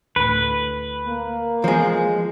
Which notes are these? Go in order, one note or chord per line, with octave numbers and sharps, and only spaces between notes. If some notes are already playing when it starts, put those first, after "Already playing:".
D2 A2 B4
A#3
E3 F3 G#3 B3